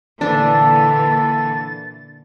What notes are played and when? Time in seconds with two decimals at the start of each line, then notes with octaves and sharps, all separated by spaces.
0.21 A#2 D3 E3 D4 A4 A6